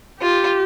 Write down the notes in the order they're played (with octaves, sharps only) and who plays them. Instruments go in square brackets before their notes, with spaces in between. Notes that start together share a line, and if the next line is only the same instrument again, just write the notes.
[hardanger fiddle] F4 [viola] G4